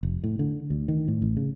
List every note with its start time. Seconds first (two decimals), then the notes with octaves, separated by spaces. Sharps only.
0.03 F1
0.24 A2
0.39 D3
0.70 D2
0.88 D#3
1.08 A2
1.22 A1
1.37 C#3